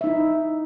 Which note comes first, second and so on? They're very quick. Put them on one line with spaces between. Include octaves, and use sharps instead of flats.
E5 D#4 E4